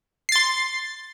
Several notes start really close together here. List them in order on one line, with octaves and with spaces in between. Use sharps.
C7 A6 C6